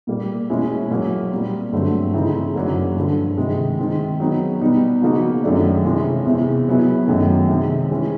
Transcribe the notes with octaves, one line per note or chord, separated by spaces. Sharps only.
A#2 G3 A#3
E2 B2 G#3 C#4 E4
A#2 F#3 A#3
A#2 G3 C4
G2 D3 F#3 A3 C4
C#3 E3 A3 C4 D#4
F#2 C#3 F#3 A#3 D4
G2 D3 F3
C3 D#3 G#3
D#3 G#3 C4
F#3 B3 D#4
B2 G3 B3 D#4
C#3 F3 A#3 D#4 F#4
F#2 D#3 F#3 A3 D4
C3 E3 G#3 C#4 F4
E2 C3 E3
B2 F#3 B3 E4 G#4
F#2 D#3 F#3 A3
C3 D#3 G#3
E3 G#3 C#4